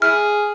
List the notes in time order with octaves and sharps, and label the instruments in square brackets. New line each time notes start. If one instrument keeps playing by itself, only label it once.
[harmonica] E4 G#4 [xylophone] F6